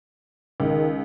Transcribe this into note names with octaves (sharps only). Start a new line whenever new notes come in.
C#2 D#3